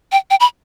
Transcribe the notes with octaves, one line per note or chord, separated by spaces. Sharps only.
G5
G5
B5